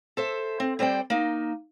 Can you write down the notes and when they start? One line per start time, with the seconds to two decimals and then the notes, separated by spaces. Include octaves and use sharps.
0.17 A4 C5 E5
0.60 C4
0.79 G3 C4 C5 D5 G5
1.10 A#3 D#4